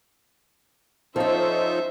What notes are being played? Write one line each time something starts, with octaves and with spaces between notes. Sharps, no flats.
F3 C#4 D#4 F4 A4 C5 E5